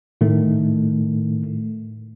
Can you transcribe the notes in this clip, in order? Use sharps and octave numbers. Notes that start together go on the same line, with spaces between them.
A2 D#3 A3